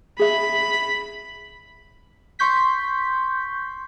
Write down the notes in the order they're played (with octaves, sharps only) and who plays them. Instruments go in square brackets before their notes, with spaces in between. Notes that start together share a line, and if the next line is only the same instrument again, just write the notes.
[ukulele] G#4 E5 [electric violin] B5
[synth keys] C6 C#6 G6 B6